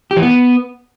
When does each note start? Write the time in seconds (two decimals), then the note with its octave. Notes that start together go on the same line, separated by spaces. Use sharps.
0.11 G4
0.17 E3
0.22 B3